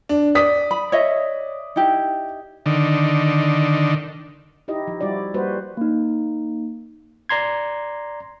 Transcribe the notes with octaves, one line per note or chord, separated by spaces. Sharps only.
D4
D5 D#6 B6
B5
C#5 D#5 E5
D#4 E4 G4
D3 D#3
D#4 E4 G4 D#5
F3
G3 E4 F#4 D5
G3 A#3 F#4 B4 C5
A#3 D#4
D5 A#5 C6 G#6